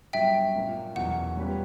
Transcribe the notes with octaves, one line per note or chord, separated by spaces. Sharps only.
G2 F#3 B3 E5 G5
A#2 A#3 C#4
E2 B2 F#3 F#5
A#2 G3 C#4 G4 B4